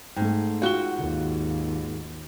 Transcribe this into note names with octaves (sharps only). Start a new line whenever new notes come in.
G#2 A3 G5
F4 F#4 G5 G7
D#2